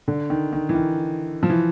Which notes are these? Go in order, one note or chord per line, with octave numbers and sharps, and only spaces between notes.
D3
D#3
D#3
E3
D#3
F3
E3